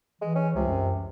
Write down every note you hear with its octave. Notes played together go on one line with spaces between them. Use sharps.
E3 G#3
C#4
C#2 C3
F#2